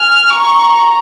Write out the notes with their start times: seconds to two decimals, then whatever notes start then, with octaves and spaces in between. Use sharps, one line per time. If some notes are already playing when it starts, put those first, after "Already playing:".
Already playing: G#5 F6
0.30 A#5 C#6